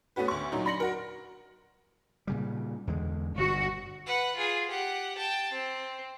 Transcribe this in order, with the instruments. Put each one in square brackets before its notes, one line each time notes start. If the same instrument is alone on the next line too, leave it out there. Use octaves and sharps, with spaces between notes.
[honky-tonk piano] A3 B3 C#4 F#4 B4
D2 C#6
A#2 F#3 D#4
D4 B5 C6 A#6 C#7 F#7
F#4 A#4
[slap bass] A#2 C#3 G3
E2 D3 G#3
[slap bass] G1 B2 [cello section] F#4
[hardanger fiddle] B4 F#5
F4 G#4
G4 F#5
G5 A5
C4